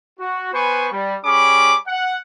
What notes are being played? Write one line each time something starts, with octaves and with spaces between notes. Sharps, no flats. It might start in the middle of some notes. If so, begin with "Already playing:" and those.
F#4
B3 B4 C5 G#5 C#6
G3
G3 C#4 G#4 B5 D6
F#5